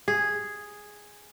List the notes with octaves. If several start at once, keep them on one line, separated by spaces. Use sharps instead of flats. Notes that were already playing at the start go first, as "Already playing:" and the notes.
G#4